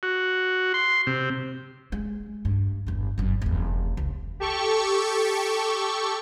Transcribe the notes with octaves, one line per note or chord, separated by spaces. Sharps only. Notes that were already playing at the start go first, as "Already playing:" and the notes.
F#4
C6
C3
G#3
G2
G1 E2
G1 F#2
F1 E2
C#2
G4 A4 C#6